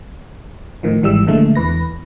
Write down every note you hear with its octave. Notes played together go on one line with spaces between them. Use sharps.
A2 D#3 F3
G#1 G#2 E3 G3 G#3 E6
A#2 D3 F3 G#3 A3
E2 E3 B4 A#6